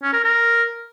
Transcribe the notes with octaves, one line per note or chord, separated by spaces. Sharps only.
C#4
A#4
A#4